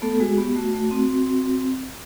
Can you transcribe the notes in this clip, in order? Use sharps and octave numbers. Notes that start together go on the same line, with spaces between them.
A3 B3 A4
G#3 F#4 G#4
B3 G4
A3 F#4
A3
C4
C4
C4